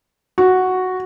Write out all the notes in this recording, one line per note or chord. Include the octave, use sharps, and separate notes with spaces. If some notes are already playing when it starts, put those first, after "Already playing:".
F#4